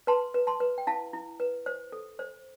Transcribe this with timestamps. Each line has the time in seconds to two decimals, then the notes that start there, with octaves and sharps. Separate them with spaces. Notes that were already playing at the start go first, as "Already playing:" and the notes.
0.07 B4 A5 C6
0.34 B4
0.47 A5 C6
0.60 B4
0.78 G5
0.87 E4 F5 A5
1.13 E4
1.40 B4
1.66 C5
1.92 A4
2.19 C5